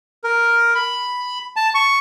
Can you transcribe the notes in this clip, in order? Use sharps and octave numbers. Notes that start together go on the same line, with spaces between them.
A#4
B5
A5
C#6